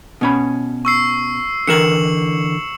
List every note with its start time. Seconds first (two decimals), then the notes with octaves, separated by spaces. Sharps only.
0.21 B2 C#4 B5
0.85 C#6 E6 C7
1.67 D3 E3 A#4 C#7 E7 F#7